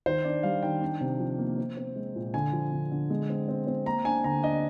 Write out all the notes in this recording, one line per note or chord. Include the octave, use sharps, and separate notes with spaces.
D#3 C5
D4 D5
G3 F5
D#3 G5
D4
C3
F3
A#3
C4
C4
G#3
A#2
D3 G#5
F3
D3
D3
G#3
C4
C4
C4
A#3 A#5
D4 G#5
D3 A#5
D4 D#5